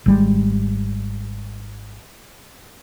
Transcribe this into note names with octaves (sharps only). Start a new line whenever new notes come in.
G#1 G3 G#3